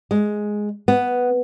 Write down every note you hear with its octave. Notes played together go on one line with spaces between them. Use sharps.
G#3
B3